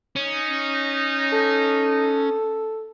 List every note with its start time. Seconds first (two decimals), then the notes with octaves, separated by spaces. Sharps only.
0.16 C#4 D#4
1.32 A4